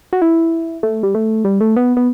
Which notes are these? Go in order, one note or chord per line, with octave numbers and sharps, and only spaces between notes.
F#4
E4
A3
G3
A3
G3
A3
B3
B3